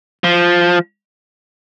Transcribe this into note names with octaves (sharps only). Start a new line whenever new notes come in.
F3